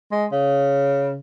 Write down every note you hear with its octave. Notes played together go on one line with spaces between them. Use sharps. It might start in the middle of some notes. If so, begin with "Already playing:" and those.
G#3
C#3